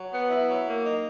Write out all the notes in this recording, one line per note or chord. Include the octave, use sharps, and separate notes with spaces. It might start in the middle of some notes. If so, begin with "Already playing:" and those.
Already playing: F#3
B3
E4
F#3
A#3
D#4